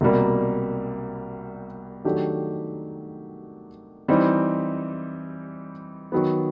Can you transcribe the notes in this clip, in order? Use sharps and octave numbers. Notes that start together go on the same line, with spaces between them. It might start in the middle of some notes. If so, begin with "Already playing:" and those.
C2 B2 G3 A#3
D#3 F#3 A3 D4 G4
E3 G3 C4 D#4
D#3 F#3 B3